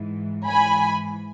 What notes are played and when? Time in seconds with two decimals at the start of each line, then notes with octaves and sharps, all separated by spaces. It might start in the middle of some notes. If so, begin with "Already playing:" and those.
Already playing: G#2 E3
0.48 G#2 E3 G#5 B5